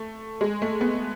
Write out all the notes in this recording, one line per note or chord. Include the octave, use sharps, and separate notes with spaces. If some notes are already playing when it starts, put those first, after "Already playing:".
Already playing: A3
G#3
A3
B3